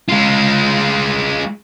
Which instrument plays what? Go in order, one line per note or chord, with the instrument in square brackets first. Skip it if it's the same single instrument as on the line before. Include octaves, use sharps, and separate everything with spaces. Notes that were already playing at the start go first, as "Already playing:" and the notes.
[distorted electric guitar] G#3 F4